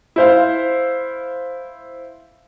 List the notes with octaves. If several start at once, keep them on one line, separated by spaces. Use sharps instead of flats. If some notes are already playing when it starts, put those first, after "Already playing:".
E4 C5 F5